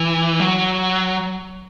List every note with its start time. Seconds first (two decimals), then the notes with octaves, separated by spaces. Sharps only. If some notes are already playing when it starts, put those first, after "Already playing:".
Already playing: E3
0.40 F#3